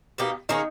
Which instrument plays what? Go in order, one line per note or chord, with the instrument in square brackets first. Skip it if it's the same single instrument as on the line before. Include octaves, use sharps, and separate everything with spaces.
[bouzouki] B2 A#3 D#4 G4
[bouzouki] D#3 A#3 C#4 G#4 [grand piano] D#4